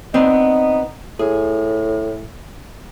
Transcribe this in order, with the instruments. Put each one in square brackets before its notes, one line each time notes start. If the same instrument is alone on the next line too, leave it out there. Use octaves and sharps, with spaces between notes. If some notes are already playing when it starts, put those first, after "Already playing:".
[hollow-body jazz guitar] B3 C4 D4 [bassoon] D#4
[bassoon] A2 [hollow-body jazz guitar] G#4